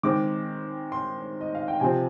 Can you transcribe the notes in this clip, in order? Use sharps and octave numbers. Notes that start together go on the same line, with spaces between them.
D#3 G#3 C4 D6
C6
D#5
F5
G5
C3 F3 C4 G#5